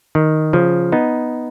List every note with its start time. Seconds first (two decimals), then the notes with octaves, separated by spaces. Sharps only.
0.15 D#3
0.53 C#3 F3
0.92 B3 D#4